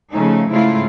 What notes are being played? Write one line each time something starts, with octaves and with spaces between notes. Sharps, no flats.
C#3 F3 A3 D#4
G#2 C#3 A3 E4 F4